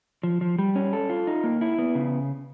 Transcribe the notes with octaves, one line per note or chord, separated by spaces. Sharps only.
F3
F3
G3
C#4
A4
F4
D#4
A#3
E4
B3
C#3